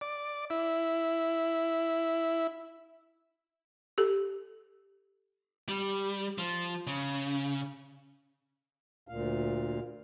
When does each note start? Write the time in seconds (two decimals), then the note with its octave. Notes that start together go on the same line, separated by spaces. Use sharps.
0.01 D5
0.50 E4
3.98 G4 A4
5.69 G3
6.38 F3
6.87 C#3
9.08 D2 A#2 F5